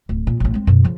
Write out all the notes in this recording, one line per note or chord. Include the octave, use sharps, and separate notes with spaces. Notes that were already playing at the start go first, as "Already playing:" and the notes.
D1
A#2
A1 C#4
G#3 C4
F#2 B2
C#3 F3